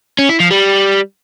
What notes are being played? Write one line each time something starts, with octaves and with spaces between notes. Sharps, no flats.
C#4
E4
F3
G3